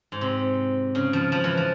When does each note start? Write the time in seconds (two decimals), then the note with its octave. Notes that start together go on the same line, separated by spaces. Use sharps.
0.12 G#2
0.21 C3
0.95 C#3
1.13 F3
1.32 F3
1.44 E3
1.57 F3